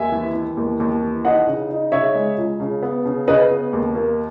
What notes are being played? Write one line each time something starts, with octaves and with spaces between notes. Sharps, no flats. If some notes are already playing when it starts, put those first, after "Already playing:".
Already playing: D#2 E5 G#5
E3
E3
D#2
D#2
E3
D#4 D#5 F#5
C#3
D#4
C#3 C#5 E5
G#3
C#2
C#3
B3
C#3
C#3 B4 D#5
B3
D#2
A#3